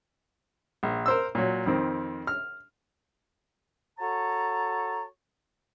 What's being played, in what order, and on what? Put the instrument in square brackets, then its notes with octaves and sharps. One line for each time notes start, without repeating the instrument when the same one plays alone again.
[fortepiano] A#1
A#4 C5 E6
A#2 F#3
F2 D#3 C4
F6
[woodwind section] F#4 A4 C#5 A5 A#5